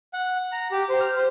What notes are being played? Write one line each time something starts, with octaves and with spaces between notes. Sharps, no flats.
F#5
A#5
G4
C5
F6
C5